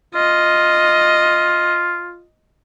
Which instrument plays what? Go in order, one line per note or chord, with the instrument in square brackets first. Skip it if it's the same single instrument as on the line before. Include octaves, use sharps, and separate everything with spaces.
[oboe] F4 [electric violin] D#5